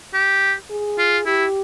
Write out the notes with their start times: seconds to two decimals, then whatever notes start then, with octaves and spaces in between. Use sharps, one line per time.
0.14 G4
0.70 G#4
0.98 F4
1.26 E4 G4